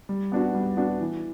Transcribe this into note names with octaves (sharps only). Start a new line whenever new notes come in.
G3
B3 D4 F#4
G3
B3 D4 F#4
E3